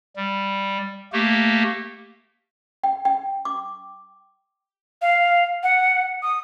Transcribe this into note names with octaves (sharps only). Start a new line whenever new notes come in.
G3
A3 A#3 G4
G5
G5
D6
F5
F#5
D#6